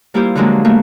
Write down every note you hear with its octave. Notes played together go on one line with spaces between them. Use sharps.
G3 A#3 E4 F4 G4 C5
D3 F3 F#3 G#3 A#3
E3 A3 A#3